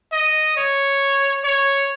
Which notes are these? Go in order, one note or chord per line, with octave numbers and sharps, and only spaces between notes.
D#5
C#5
C#5